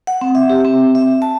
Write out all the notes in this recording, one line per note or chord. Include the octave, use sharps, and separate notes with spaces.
F#5
C4
E5
G4
C4
E5
A5